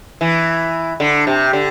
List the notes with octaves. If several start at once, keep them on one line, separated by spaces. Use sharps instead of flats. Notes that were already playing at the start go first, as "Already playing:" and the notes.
E3
D3
C3
D3